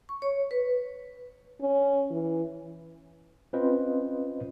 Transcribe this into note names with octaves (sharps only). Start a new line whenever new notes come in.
C#6
C#5
B4
C#4
E3
C4 C#4 F4 B4 C5 D#5